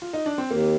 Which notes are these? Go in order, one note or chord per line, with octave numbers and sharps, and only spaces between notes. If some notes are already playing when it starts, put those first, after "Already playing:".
F4
D#4
D4
C4
D#2 A#3